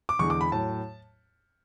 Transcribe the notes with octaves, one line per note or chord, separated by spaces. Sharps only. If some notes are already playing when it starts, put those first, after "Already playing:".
D6
E2 D3 G#3 C#6
D6
B5
A2 F#3 A5